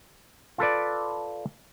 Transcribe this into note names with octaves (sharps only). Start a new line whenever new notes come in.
F4 A4 B4 D5